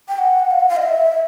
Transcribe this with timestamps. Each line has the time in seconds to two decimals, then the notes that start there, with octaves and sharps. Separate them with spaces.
0.08 G5
0.18 F#5
0.50 F5
0.59 F#5
0.69 F5
0.77 D#5
0.83 E5